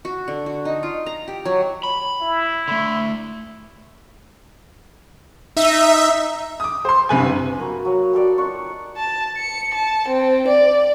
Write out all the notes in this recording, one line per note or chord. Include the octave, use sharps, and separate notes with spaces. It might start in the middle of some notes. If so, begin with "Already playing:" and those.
F#4
D3
F#4
D#4
F4
A#5
G4
F#3
B5
E4
D3 A3
D#4 E5
D6 D#6
C5 C6
F#1 G2 C3 B4 G#5
A#3 F#4 B5
F#3
G4 A4 D5 F#5
D#4 F4 F#5 C#6
A5
C#7
A5
C4
D5